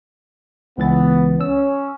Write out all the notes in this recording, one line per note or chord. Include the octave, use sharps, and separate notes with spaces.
C#2 E3 B3 A6
C#4 E6